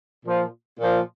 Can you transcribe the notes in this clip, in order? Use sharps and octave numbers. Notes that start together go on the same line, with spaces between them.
A#2 F3
A#2 F3